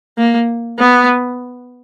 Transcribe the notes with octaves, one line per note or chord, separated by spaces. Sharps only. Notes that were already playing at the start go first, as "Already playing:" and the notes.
A#3
B3